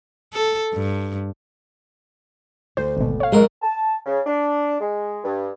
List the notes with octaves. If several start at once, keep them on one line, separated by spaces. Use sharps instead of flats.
A4
G2
D2 C5
G#1 B2
C#5 F5
B1 F2 G#3 A#4
A5
C#3
D4
G#3
G2